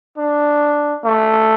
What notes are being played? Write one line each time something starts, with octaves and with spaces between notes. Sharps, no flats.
D4
A3